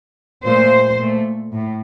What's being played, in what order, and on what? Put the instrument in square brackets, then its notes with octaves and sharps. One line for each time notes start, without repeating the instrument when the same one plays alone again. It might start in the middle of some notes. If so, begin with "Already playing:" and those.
[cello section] A#2 A3 C5
A#2 A3
A2